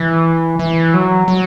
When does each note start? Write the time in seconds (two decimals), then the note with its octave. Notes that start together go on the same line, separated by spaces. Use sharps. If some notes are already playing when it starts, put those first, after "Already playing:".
Already playing: E3
0.59 E3
0.94 F#3
1.28 F#3